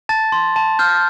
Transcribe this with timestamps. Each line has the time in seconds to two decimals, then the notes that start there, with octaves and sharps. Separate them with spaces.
0.09 A5 A6
0.32 C6
0.56 A5
0.79 F6 G6